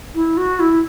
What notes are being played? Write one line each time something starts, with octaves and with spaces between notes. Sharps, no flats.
E4
F#4
E4